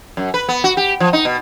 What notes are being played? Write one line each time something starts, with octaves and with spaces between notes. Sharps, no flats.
F#2
B4
B3
F#4
G4
F3
D#4
B2